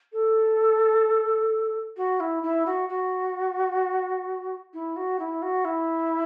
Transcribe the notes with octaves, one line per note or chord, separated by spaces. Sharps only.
A4
F#4
E4
E4
F#4
F#4
E4
F#4
E4
F#4
E4